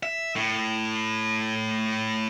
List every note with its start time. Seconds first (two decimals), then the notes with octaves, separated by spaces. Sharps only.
0.03 E5
0.36 A2